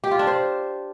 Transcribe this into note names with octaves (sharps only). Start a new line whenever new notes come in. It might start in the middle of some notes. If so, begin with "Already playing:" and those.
G4
F4
D4
C5